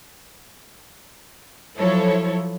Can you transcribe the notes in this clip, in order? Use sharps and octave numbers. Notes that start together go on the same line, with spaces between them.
F3 F#3 E4 A4 C#5